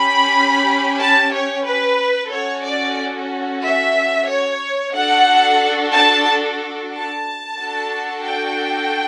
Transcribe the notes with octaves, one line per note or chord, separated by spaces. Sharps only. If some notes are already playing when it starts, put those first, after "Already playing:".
Already playing: C#4 G4 B5
A5
C#5
B4
C#4 F#4 A4 C#5
D5
E5
C#5
D4 F#4 A4 F#5
A5
A5
D4 F#4 A4
G5